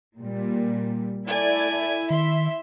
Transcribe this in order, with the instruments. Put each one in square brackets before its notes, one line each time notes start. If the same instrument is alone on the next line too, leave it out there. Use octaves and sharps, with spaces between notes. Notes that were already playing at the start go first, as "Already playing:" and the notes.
[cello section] A#2 G3
[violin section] A3 D5 G#6 [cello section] E4 [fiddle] G#5
[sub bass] D#3 [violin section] E5 [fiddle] C6